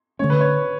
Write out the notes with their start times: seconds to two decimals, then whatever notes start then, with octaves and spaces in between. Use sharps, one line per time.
0.19 D3 A3 C#4 C#5
0.30 B4
0.40 C#5